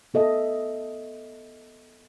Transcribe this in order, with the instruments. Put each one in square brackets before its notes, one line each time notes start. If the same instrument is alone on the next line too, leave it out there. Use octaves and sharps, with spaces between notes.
[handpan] B3 A4 D#5 E5